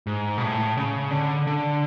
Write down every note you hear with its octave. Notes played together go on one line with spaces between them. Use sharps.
G#2
B2
A2
C#3
D3
D3